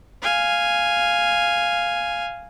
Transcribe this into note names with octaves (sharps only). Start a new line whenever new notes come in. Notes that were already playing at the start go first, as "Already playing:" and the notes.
F5 G#5